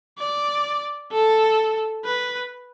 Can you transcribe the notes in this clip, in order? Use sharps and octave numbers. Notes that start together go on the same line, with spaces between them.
D5
A4
B4